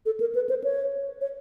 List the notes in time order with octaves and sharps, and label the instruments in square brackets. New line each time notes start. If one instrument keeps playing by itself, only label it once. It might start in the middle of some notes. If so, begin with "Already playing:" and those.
[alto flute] A4
A#4
B4
C5
C#5
C#5